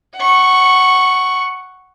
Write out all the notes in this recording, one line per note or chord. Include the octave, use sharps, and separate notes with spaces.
F#5 C#6